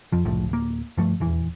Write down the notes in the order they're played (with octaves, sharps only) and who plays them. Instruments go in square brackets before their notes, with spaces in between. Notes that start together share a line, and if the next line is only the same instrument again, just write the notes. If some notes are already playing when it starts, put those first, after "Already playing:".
[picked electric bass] F2 F3
F#1 C2 A2 F3
D1 A#3
G2 F3 A3
D#1 E2 E3